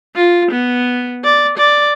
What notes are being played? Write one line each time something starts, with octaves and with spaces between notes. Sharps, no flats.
F4
B3
D5
D5